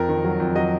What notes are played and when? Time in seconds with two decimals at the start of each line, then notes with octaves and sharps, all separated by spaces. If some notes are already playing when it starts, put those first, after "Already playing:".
Already playing: F2 A#4
0.09 D#3
0.25 F#3
0.40 F2
0.55 F#3 D#5